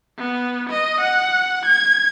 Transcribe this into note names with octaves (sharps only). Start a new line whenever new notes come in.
B3
D#5
F#5
G#6